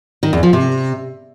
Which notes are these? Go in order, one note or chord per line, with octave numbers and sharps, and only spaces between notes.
D#3
E2
F3
C3